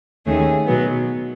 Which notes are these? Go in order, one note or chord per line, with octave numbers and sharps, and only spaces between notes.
D#2 D#3 A3 C#4 G#4
B2 F#3 B3